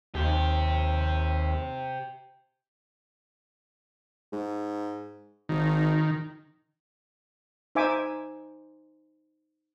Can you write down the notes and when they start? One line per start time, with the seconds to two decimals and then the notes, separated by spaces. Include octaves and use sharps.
0.15 D#2 G4 C5
4.33 G#2
5.49 G#1 D#3
7.75 D#4 C5 E5 G#5 D6